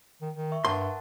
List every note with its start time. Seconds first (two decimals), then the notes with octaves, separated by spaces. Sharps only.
0.21 D#3
0.35 D#3
0.52 E5 C#6
0.65 G2 A#4 F#5 A5 C6